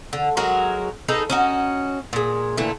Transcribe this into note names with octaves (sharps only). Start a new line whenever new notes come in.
D3
F#3 G#3 F#4 A#4
D#4 G#4 A4 B4
C#4 D#4 F#4
A#2 G#3
A#2 D3 E3 A3